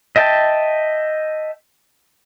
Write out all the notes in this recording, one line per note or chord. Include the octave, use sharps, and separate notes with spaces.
D#5 E5 G5 A5